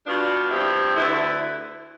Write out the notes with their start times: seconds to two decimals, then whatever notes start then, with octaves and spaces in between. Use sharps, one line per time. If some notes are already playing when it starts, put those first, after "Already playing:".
0.06 B2 G3 B3 D4 F4
0.50 G2 F3 C4 E4 G4
0.94 D2 D3 A3 E4 B4